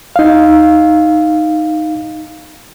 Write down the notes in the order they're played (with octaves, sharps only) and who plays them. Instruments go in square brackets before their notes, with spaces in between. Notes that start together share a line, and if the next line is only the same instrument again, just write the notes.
[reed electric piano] D#4 F5